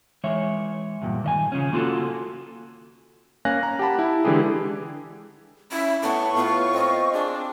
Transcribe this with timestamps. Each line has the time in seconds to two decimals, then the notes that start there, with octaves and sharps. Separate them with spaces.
0.24 E3 G#3 C#5 E5
1.02 E2 G2 A#2
1.24 D#3 D#5 G#5
1.52 C#3 F3 C#4
1.73 A#3 F4 F#4 A4
3.45 A#3 C#4 F5 G#5 F#6 A#6
3.63 A#5
3.79 G4 F#5 A5 B5
3.99 E4
4.24 D3 E3 G#3 G4 G#4
5.72 C#4 E4 E5
6.03 A2 B3 A5 C#6
6.36 A2 B3 F4
6.74 C4 D#5
7.13 D4 G#4